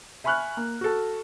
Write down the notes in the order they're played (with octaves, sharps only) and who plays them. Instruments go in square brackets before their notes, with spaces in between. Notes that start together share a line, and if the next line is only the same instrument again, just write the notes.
[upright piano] E5 G#5 B5 C#6 F6 F#6
A#3
F#4 A4